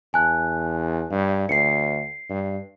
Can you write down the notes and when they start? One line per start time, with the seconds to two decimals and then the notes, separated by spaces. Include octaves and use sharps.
0.14 E2 G#5 A5 F#6
1.11 G2
1.49 D2 C7 C#7
2.30 G2